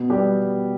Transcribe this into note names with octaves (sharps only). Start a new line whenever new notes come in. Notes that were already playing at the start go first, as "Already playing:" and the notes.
Already playing: B2
G3 B3 G4 D5